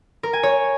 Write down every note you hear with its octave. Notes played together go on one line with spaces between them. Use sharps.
A#4
G#5
C#5